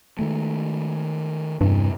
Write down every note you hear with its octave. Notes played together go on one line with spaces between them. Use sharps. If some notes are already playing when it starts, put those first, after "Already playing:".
D#3 G#3 A3
E2 G2 C3 E3